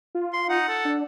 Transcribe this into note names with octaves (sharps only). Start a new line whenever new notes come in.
F4
C6
D#4 F#5
A4
D4